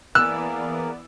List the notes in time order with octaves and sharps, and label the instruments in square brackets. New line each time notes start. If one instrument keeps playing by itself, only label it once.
[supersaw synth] E3 B3 D5 [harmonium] A#3 G#4 A#4 [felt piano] E6 [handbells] F#6